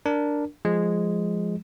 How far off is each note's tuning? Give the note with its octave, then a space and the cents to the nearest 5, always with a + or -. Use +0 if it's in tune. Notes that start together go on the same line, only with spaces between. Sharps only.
D4 +0 A#4 +0
F3 +0 G#3 +0